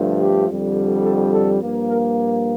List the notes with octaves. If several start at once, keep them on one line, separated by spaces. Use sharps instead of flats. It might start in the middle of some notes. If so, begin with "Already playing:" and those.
Already playing: G2 D3 F3 A3
G4
F2 D3 G3
A4
A4
G2 F3 A#3
A#4